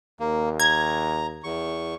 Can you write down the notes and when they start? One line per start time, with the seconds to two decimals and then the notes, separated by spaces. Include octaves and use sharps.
0.20 D#2 A#3
0.60 A#5 G#6
1.44 E2 C#6